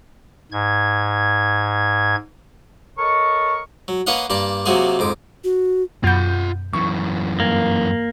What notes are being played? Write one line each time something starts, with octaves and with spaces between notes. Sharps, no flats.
G#2 G#6
A4 A#4 C#5 D#5 C#6
F#3
A#3 B4 C#5 D#5 F5 F#5
G2 A#3 D5 A5
C3 F#3 A#3 F4 F#4 G#4
F2 G#2 D6
F#4
F#2 B2 F4 F#5 G6
F#2 E3 C#6
G2 A#3